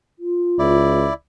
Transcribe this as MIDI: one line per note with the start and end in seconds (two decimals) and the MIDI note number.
0.19 0.98 65
0.59 1.08 37
0.59 1.14 64
0.59 1.14 74